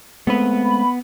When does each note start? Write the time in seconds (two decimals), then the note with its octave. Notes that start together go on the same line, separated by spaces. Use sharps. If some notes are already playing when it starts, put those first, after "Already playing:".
0.27 G#3 A3 B3 C4 B4
0.64 B5